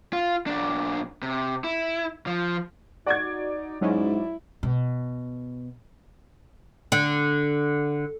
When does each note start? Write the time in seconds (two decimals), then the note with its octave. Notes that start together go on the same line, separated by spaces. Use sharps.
0.13 F4
0.46 B1 D4
1.22 C3
1.64 E4
2.27 F3
3.06 D#4 F#4 D5 G#6
3.81 G#2 F#3 G#3 C#4 E4
4.63 B2
6.92 D3